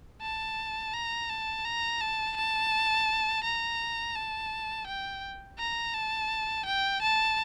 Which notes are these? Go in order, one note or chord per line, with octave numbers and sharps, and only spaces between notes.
A5
A#5
A5
A#5
A5
A5
A#5
A5
G5
A#5
A5
G5
A5